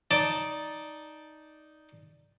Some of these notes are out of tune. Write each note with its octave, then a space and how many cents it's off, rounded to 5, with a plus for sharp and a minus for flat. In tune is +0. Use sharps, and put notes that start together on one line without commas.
D#4 +0 D5 +0 A5 +0